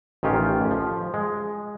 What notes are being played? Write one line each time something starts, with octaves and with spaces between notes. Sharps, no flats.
A1 D#3 C#4 F4 G4
F3
G#3